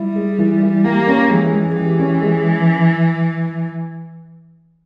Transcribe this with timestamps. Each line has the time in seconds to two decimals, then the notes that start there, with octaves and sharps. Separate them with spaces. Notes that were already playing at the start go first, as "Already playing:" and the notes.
Already playing: G3 E4
0.16 G#3
0.38 E3
0.62 E3
0.84 A#3 G4
1.07 C#4
1.30 E3 G#3
1.53 G#3
1.75 E3 G4
1.99 C#4
2.22 G#3